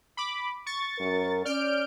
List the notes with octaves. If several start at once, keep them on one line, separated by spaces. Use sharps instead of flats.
B5 D6
C#6 A6
F#2 A#4
C#4 D5 F6 G6 D7